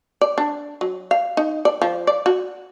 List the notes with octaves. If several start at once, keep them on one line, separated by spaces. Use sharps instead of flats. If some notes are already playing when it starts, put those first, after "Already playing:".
D5
D4
F#3
F5
D#4
D5
F3
D5
F#4